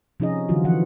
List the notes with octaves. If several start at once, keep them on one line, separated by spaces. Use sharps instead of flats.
C3 F3 C#4 D#4 G#4 D#5
D3 E3 F#3 F4 F#4
E3 F3 F#5